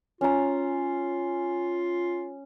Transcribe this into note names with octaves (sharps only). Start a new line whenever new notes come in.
C#4 F4 A#5